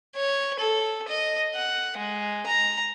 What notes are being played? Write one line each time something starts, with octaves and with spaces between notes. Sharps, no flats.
C#5
A4
D#5
F#5
G#3
A#5